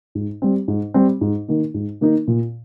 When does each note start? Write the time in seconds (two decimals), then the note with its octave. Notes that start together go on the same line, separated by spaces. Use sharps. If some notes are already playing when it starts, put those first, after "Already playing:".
0.15 G#2
0.42 G3 C4
0.68 G#2
0.94 G3 C4
1.21 G#2
1.48 D#3 A#3 D#4
1.74 G#2
2.01 D#3 A#3 D#4
2.28 A#2